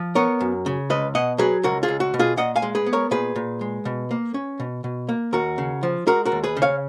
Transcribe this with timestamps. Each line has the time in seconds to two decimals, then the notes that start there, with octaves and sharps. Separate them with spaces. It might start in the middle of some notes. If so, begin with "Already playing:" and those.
Already playing: F3
0.15 B3 A#4 C#5
0.41 F#2
0.66 C#3
0.90 C#2 B4 D#5
1.15 B2 D#5 F#5
1.38 F#3 G#4 B4
1.63 C#2 F#4 A#4
1.83 F4 G#4
1.88 C#2
2.00 F#4
2.14 B2
2.19 F4 G#4
2.37 A#2 D#5 F#5
2.56 F5 G#5
2.62 G#3
2.75 G#4 B4
2.86 B3
2.93 A#4 C#5
3.11 A#2 G#4 B4
3.36 A#2
3.61 G#3
3.85 B2
4.11 A#3
4.34 C#4
4.60 B2
4.84 B2
5.09 A#3
5.33 D#2 F#4 A#4
5.58 C#3
5.83 F3
6.07 G#3 F#4 A#4
6.25 F#4 A#4
6.32 D#2
6.44 G#4 B4
6.57 C#3
6.62 C#5 F5